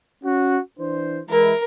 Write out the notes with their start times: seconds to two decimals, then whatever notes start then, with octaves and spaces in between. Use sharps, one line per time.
0.24 C#4 F#4
0.80 E3 D4 C5
1.30 E3 G#3 E4 A#4